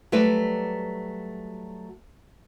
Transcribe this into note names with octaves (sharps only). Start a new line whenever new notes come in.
F#3 G3 A3 B4 D5